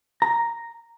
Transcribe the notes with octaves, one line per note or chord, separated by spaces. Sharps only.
A#5